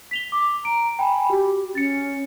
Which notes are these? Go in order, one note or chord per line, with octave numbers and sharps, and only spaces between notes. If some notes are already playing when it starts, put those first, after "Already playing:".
B6 F7 G7
D6
A#5 D7
G5 G#5 B5
F#4 G4
C#4 A6 C#7